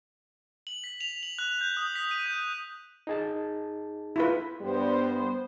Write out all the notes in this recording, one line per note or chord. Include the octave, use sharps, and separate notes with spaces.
F#7
B6
F7
F#7
F#6
G6
D#6
B6
D#7
G6
D#4 G#4 A5
E4 F4 B4
G2 G3 B3 C5